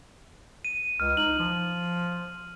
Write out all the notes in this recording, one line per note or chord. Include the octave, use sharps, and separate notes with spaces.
D#7
C#2 F6
D#4 F#7
F3